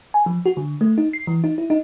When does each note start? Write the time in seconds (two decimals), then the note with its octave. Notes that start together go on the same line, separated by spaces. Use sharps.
0.14 G#5
0.26 F3
0.46 F#4
0.57 D3
0.81 A3
0.98 D#4
1.13 C7
1.27 E3
1.44 D#4
1.58 E4
1.70 D#4